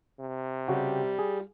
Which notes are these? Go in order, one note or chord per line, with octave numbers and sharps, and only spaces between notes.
C3
C#3 G3 F#4 G5
G#4